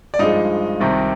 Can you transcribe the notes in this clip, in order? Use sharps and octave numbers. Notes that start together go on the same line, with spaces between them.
D5
G2 F3 G#3 D#4 D#5
C2 C3 D#3